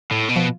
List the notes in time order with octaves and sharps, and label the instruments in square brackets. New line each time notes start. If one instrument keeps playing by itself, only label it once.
[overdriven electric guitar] A2
B2
[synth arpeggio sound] F3